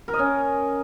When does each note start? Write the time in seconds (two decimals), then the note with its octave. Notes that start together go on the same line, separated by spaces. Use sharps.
0.08 A#4
0.13 D#5
0.19 C#4